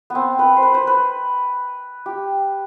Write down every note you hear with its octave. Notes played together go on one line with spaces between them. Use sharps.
B3 C4
B4
C5
B4
C5
B4
G4